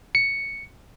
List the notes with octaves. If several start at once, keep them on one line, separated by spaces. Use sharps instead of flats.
C#7